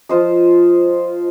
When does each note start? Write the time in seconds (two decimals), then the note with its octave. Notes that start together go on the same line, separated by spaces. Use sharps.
0.09 F3 F4 C5 D#5